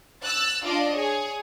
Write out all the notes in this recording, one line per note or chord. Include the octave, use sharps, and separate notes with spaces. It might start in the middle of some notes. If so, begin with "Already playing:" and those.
E6 F#6 A6
D4 F4 D5 D#5
G#4 C#5